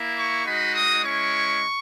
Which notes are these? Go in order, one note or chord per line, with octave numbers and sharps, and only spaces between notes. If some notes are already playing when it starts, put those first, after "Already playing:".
Already playing: A#3 E4
C#6
G#3 D#4 F#4 B5
D#6
G#3 C#4 E4 C#6